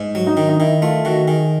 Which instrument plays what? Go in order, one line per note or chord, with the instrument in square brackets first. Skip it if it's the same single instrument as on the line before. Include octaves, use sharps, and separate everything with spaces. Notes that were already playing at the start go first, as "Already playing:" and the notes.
Already playing: [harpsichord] G#2
F#3
[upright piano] D#4
[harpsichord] D#3
[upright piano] D#4
[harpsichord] D#3 [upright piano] E4
[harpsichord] A3 [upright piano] F4
[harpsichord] D#3 [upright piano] F#4
[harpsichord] D#3 [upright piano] G#4